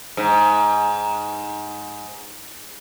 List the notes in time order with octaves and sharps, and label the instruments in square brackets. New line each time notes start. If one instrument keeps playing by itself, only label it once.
[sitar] G#2